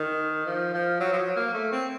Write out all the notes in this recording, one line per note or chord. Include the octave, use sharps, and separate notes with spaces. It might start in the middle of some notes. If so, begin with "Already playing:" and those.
Already playing: D#3
F3
F3
F#3
F3
F#3
A#3
A3
C4